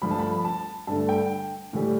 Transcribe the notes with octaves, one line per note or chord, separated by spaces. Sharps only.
G2 F3 A3 B5
A5
B5
A5
G2 D3 A3 A5
G5
A2 E3 G3